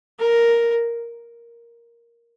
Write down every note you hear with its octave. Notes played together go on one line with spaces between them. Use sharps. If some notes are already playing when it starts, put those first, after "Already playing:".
A#4